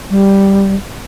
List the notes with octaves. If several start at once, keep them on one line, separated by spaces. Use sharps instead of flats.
G3